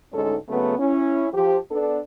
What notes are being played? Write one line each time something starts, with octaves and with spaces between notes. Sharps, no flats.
D2 G#2 G#3 C#4 D#4 A4
C#3 F#3 A3 B3
C#4 E4
F3 G4
B3 D4 A4